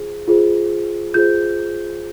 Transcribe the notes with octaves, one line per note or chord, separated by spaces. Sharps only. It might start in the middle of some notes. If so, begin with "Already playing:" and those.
Already playing: F4 G#4 C5
F4 G#4 C5
F4 G#4 C5 G6